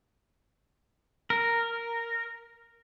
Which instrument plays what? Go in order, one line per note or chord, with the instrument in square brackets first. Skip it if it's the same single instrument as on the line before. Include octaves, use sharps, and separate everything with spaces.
[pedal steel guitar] A#4